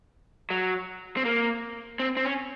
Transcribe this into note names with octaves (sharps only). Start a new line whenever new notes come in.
F#3
C4
A#3
C4
C4
C#4